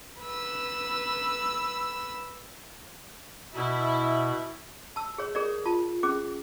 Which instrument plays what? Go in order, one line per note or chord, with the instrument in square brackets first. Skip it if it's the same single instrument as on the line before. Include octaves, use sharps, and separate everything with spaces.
[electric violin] B4 E6
[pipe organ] B2 [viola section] E4
[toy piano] A5 E6
G#4 C#5
G#4 A#4 C#5 D5
F4 A5
C#4 G#4 D6